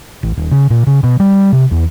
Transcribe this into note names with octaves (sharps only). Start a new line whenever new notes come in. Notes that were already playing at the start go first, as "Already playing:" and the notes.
A1
D#1
C#3
A#2
C#3
B2
G3
C3
E2